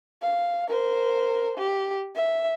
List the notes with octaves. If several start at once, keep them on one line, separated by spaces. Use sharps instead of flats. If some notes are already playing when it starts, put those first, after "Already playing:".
F5
A#4 C5
G4
E5